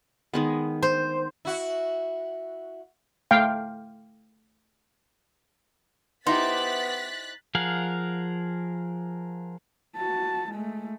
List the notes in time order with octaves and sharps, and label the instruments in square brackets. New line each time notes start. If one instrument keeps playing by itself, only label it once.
[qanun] D#3 G#3 B3
[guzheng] C5
[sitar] E4 F#4
[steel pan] A3 F5 G5
[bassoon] B3 [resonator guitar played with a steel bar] D#4 E4 G4 [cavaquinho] C5 [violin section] F#6 A6 B6
[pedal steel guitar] F3 G#4 A#4 F5 F#5
[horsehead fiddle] F#4 A5
G#3 A3